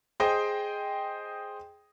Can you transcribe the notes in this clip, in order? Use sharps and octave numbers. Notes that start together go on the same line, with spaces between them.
G#4 C5 D#5 G5